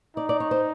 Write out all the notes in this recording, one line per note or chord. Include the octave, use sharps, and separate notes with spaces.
D#4 D5
D5
C#5
C5